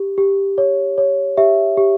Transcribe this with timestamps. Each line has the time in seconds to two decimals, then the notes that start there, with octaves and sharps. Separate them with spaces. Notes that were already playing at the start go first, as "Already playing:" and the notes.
Already playing: G4
0.18 G4
0.58 C#5
0.98 C#5
1.37 G4 E5
1.78 G4